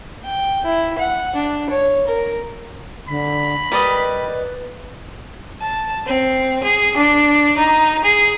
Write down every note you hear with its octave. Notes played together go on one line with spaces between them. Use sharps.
G5
E4
F#5
D4
C#5
A#4
D3 B5
G3 A#4 B4 D5 D#5
A5
C4
G#4
D4
D#4
G#4